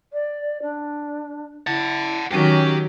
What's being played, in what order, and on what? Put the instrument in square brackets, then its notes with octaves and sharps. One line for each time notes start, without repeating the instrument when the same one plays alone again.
[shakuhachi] D5
D4
[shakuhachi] E4 [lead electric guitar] F#5 A5
[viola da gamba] D#3 F#3 [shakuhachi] C#4 [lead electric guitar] G4 G5